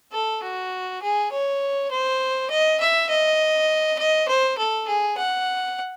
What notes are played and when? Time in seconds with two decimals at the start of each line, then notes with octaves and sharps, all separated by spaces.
0.13 A4
0.43 F#4
1.03 G#4
1.32 C#5
1.91 C5
2.50 D#5
2.80 E5
3.10 D#5
3.99 D#5
4.28 C5
4.58 A4
4.88 G#4
5.18 F#5